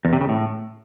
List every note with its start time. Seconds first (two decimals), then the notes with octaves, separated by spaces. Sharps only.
0.05 E2
0.13 C3
0.21 C#3
0.29 A2